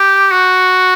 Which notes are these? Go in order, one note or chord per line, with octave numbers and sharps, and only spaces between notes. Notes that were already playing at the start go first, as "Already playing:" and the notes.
Already playing: G4
F#4